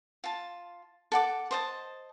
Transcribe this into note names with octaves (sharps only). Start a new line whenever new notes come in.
F4 A5
A4 F#5 D6
C5 D#5 A5